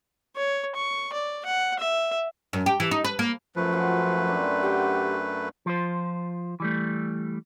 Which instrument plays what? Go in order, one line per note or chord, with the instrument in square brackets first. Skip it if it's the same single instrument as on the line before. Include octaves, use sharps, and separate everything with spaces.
[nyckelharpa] C#5
C#6
D5
F#5
E5
[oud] F#2
G4
E3
D#4
B4
A#3
[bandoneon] F#2 A3 B4 [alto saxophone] F3
[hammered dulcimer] C#4 F4 F#4
C4 D4
[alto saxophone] G4 [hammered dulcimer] F#5 G5 C6
[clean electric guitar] F3 F4 C5
E3 G3 A3